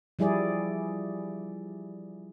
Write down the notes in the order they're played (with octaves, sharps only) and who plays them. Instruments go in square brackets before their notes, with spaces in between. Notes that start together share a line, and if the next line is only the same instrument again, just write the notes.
[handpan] F3 G3 E4 G#4 D5